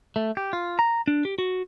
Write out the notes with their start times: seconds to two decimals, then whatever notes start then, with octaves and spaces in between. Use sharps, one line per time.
0.16 A3
0.37 G4
0.53 F4
0.79 A#5
1.08 D4
1.25 G4
1.38 F#4